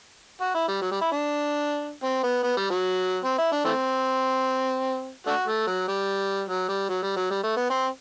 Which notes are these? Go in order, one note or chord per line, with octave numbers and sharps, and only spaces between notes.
F#4
E4
G3
F#3
G3
E4
D4
C4
B3
B3
G3
F#3
C4
E4
D4
E3 A3 C4
A3 D4 F#4
A3
F#3
G3
F#3
G3
F#3
G3
F#3
G3
A3
B3
C4